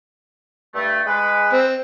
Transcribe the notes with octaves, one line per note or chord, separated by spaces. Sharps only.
G2 A3
G#3 B4
C4